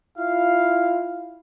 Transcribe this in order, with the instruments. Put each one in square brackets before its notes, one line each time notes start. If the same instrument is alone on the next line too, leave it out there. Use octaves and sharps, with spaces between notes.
[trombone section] E4 F4 [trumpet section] F5